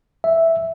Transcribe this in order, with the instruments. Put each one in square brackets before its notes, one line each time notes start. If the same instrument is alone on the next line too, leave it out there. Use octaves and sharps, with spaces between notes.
[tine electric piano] E5